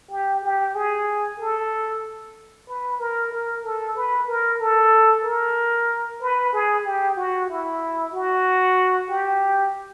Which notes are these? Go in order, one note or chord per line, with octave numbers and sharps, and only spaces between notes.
G4
G4
G#4
A4
B4
A#4
A#4
A4
B4
A#4
A4
A#4
B4
G#4
G4
F#4
E4
F#4
G4